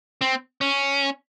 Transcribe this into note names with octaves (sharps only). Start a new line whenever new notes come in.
C4
C#4